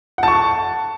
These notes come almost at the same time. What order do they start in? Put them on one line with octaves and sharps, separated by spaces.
F#5 A5 C#6